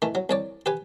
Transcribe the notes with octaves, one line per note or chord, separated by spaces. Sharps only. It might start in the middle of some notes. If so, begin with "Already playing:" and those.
D#3 E3 A3
F#3
C2 C#5 D5
G4 B4 G#5